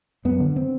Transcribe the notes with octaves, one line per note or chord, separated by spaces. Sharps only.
F#2 B3
D3
C4